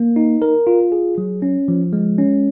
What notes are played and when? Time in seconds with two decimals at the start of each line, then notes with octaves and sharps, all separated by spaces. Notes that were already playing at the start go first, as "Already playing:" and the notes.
Already playing: A#3
0.16 D#4
0.42 A#4
0.67 F4
0.92 G#4
1.18 F#3
1.42 C#4
1.68 F3
1.93 G#3
2.18 C#4